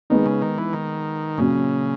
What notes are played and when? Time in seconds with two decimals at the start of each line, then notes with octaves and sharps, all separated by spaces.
0.10 D#3 G#3 B3 D#4
0.26 C#3
0.42 D#3
0.58 E3
0.73 D#3
1.38 A#2 C#3 F#3 C#4